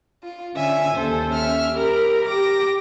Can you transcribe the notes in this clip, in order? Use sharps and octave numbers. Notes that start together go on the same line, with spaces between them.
F4
D3 C#4 E5 G#5
D#2 A4 C5
C#4 E5 F6
G4 A#4 B5
G4 D6 A#6